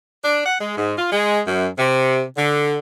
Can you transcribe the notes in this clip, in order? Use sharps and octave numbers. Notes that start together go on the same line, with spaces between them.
D4
F#5
G#3
G#2
F4
G#3
F#2
C3
D3